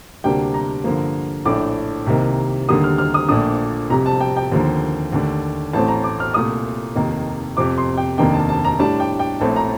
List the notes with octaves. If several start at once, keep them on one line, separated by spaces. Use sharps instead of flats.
D2 C3 G3 A#3 D4 G5
A#5
G2 D3 F3 A#3
A#1 A2 A3 D4 D6
C2 C3 D#3 A#3
D#2 D3 G3 A#3 D#6
F6
F6
D#6
A#1 A#2 A3 D4 D#6
F1 F2 C3 G3 A#5
A5
G5
G5
D#2 D3 F3 A#3
D#2 D3 A3 D4
A1 A2 A3 C4 A5
A#5
D6
F6
C2 A#2 A3 D#6
F1 D#2 D#3 A#3
F2 C3 F3 D6
C6
G5
F1 D#2 D#3 A#3 D4 G5
A5
A5
A#5
A2 G3 D4 A5
G5
G5
A#1 A2 A3 C4 A5
A#5